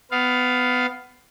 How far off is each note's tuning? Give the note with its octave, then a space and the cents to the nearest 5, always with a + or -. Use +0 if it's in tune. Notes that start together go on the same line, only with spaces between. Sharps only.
B3 +20 F5 +5